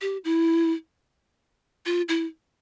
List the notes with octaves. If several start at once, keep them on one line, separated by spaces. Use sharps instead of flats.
G4
E4
F4
E4